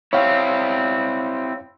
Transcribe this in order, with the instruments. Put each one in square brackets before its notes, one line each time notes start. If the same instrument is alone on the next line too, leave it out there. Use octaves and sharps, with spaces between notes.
[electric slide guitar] C4 E4 [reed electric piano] C#5 F5